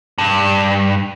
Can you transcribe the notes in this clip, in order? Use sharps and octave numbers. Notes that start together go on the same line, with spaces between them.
G2